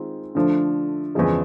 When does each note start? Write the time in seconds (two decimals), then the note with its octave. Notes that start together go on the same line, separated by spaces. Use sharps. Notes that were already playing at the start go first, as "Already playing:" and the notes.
Already playing: D#3 G#3 C4 F4
0.35 D3 F3 A3 D4
1.15 E2 C#3 F3 G#3